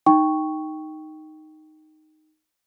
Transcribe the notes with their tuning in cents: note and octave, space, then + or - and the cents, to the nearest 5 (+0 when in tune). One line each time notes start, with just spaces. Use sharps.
D#4 +0 G5 +0 C#6 +0